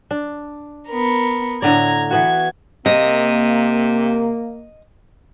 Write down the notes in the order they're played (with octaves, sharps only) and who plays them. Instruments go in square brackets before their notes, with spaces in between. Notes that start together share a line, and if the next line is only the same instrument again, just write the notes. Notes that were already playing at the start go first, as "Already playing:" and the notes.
[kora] D4
[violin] B3 A#4
[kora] A2 D3 D5 [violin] A#5 G#6
[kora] E3 B3 F#4 [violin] G#6
[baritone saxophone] C3 [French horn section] A#3 [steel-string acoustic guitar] D#5